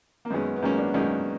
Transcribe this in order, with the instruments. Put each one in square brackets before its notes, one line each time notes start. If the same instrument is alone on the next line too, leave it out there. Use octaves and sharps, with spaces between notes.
[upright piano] A#3
[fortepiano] F#2 D#3 G#3 C#4 [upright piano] B3
[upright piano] B3
[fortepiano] F#2 D#3 G#3 C#4 [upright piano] A#3
[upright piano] D4
[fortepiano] F#2 D#3 G#3 C#4